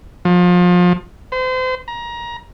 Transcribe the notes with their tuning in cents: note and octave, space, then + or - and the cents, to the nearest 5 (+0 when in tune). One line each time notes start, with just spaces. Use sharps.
F3 +30
C5 -35
A#5 +25